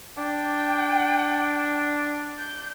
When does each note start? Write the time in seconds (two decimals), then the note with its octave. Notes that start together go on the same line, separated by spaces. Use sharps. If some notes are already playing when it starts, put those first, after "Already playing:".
0.18 D4 G5
2.38 G6